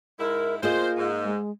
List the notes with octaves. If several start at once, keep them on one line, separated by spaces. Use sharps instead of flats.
G#2 G#3 E4 A#4
A#3 F4 G#4 C5 D#5
G#2
G#3